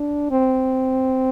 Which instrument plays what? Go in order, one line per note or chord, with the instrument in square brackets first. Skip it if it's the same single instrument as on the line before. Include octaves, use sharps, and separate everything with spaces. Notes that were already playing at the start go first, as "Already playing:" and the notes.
Already playing: [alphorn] D4
C4